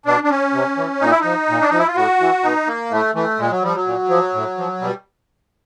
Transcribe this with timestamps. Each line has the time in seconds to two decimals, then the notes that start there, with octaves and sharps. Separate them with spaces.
0.06 B2 D4
0.24 D4
0.30 C#4
0.54 C3
0.77 E3
1.01 A#2 D#4
1.10 E4
1.20 F3 D#4
1.49 A#2
1.61 D4
1.70 F3 D#4
1.78 E4
1.88 F4
1.96 A2 F#4
2.20 E3
2.44 B2 D#4
2.68 A#3
2.91 A2 A3
3.15 E3 A3
3.39 A#2 G#3
3.51 F#3
3.63 F3 G3
3.75 F#3
3.86 A#2
4.10 F3
4.34 A2
4.58 F3
4.81 B2 G3